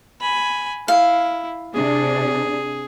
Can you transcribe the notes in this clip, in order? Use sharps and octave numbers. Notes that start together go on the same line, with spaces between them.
G#5 B5
E4 F5
C3 D4 G#4